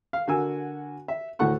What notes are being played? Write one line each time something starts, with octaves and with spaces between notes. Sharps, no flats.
F5
D3 F#4 A#4 G#5 E6
E5
D2 A2 A3 A4 F#5 C#6